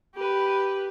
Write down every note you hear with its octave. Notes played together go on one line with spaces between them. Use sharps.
G4 B4